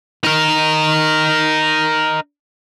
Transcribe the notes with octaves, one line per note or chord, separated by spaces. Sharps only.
D#4 A#4